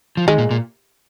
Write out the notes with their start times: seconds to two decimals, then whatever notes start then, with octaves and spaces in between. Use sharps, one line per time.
0.17 F3
0.28 D#3 G#3
0.38 A#2
0.51 A#2